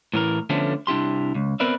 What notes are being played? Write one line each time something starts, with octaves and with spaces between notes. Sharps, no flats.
A2 E3 A#4
D3 F3 A3 B3 C#4 D4
C2 D4 E4 G4 C6
C#2
B3 C4 A#4 B4 D5 E5